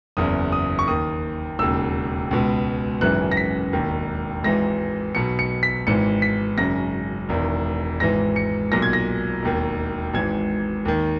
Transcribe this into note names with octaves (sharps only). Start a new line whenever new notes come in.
F#1 E2 C#3 D#6
D#6
C#6
D#2 D#3 D#6
E1 D#2 C#3 E6
C#2 B2
G#1 F#2 C#3 E3 F#6
A#6
B6
E1 D#2 D#3
G#1 G#2 E3 A#6
B1 B2 C#7
C#7
B6
G#1 G#2 E3 C#7
B6
G#1 F#2 C#3 A#6
E1 E2 D#3
G#1 G#2 E3 A#6
C#7
B1 A#2 A#6
G#6
A#6
E1 D#2 D#3
G#1 G#2 E3 G#6
D#2 D#3